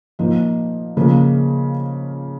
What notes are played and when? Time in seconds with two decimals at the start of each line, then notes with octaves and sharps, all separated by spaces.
0.19 A#2 F3 A#3 D#4
0.97 C#3 F3 A#3